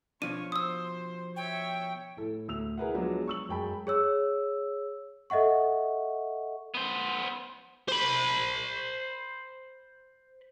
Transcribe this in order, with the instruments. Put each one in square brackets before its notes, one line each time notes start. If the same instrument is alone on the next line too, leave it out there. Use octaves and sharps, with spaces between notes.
[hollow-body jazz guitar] B2 F3 D4 [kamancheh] C#5 [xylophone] D#7
[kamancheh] C5 [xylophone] D#6 E6
[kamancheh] C#5 E5 [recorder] G5
[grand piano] A2 E4 A4
D2 E6 F7
E4 G#4 A#4 B4 E5 F#5
F3 F#3 G#3 B3 D4
C#6 E6 F#7
F#2 G#3 G5 A5 B5
[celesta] G#4 C#5 E6
A4 D#5 E5 F#5 C#6
[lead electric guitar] B3 C5
[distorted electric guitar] C5 B5